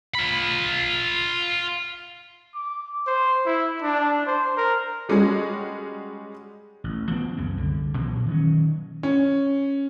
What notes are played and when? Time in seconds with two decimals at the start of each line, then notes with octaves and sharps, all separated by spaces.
0.15 F4 B5
2.54 D6
3.07 C5
3.46 E4
3.82 D4
4.27 C5
4.57 A#4
5.09 G3 G#3 C#4 F#4 G#4
6.84 A1
7.11 F3 B3 C4
7.37 C#2 F#2 C#3 C4
7.57 C2 D3
7.98 A#2 E3 F#3 A#3
8.27 D#3 F#3 C#4
9.03 C#4